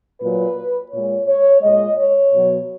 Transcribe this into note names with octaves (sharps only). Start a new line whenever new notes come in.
A#2 F#3 B4
A#2 G#3 C#5
C#5
A#2 G#3 D#5
C#5
B2 F#3